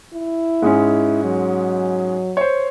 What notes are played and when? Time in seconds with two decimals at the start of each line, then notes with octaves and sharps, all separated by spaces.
0.14 E4
0.62 G#2 G#3 C#4
1.24 F#3
2.37 C5 C#5